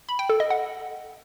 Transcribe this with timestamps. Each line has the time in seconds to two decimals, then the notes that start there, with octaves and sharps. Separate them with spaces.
0.09 B5
0.19 G5
0.30 A4
0.40 D#5
0.50 F#5